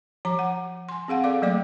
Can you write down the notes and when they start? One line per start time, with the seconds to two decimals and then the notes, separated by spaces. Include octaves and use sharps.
0.25 F3 A#5 D6
0.39 F#5
0.89 G#5 C6
1.08 C4 G#4 F5 F#5
1.24 A4 D5 F5 D6
1.42 F#3 A3 A#3 D5 G5 D6